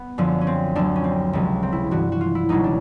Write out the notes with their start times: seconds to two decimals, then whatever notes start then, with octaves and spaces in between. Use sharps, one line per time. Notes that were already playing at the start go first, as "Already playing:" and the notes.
Already playing: B3
0.18 F#2 D3 F3
0.41 C#4
0.47 C4
0.75 D2 D3 F#3 D4
0.96 C#4
1.04 C4
1.33 C#2 C3 F3
1.63 C4
1.72 E4
1.91 G2 E3 F#4
2.12 F#4
2.21 F4
2.35 E4
2.49 C#2 B2 F#3 D#4
2.64 D4